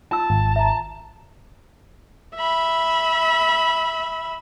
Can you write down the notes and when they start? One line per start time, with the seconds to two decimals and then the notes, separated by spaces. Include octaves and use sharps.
0.12 F4 A5 E6
0.30 G#1
0.56 E5 A#5
2.35 E5 B5